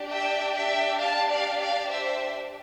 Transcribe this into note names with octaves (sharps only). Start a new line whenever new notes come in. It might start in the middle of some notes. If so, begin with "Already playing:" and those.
Already playing: D4 G4
E5 G5
E5 G5
F5 A5
D5 F5
D5 F5
C5 E5